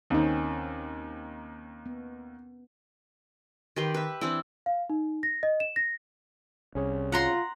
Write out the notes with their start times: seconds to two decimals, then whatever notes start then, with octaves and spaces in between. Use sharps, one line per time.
0.10 D#2 D#3 C4 C#4
1.86 B3
3.76 D#3 G4 B4 C6
3.94 B4 E5
4.21 E3 C4 D4 E4
4.66 F5
4.90 D#4
5.23 A#6
5.43 D#5
5.60 E7
5.76 A#6
6.75 C2 C#4 G#4 C#5
7.12 F4 F#5 A#5 C6